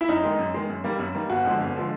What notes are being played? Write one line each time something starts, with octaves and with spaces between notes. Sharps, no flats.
E4
F#2 D#4
D#3 G#3
F#2
D#3 G#3
F#2
D#3 G3 A#3
F#2
D#3 G3 A#3
G1 F#4
F2 D3 F3 G#3
G1
D3 F3 G#3